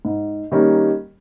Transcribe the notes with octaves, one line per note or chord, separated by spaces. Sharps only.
G#2
D#3 G3 A#3 C#4